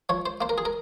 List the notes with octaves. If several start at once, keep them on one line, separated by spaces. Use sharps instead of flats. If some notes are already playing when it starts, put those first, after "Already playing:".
F3 C#5
C5
A#3 C5
A#4
G#4
A#4